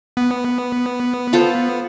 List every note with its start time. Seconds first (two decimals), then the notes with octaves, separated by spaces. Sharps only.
0.17 B3
1.33 F4 A4 C5